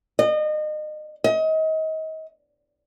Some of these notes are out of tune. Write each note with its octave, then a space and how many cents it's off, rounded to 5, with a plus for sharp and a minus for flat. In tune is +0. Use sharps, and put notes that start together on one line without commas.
D#5 -30
D#5 +30